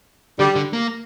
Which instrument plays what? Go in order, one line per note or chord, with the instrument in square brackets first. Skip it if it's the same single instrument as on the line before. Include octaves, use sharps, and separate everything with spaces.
[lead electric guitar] D3 [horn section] G3
[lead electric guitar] D3
A#3